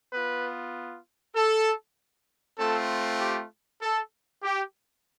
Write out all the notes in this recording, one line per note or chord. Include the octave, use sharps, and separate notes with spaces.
B3 F4 B4
A4
A3 C4 F4 A4
G4
A4
G4